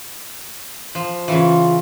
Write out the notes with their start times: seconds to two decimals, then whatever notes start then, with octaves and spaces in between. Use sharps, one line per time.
0.95 F3
1.28 C#3 E3 F4